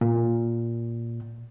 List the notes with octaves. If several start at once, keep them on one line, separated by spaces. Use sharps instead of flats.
A#2